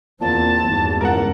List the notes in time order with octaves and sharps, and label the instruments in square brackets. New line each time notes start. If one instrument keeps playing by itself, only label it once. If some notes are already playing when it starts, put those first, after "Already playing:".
[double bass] E2 C4 [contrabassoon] A#2 [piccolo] A5
[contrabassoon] G#1 [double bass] E2 G2
[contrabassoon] C#2 [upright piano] A#4 F#5